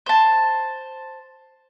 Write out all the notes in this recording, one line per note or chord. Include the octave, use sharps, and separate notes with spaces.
C5 A5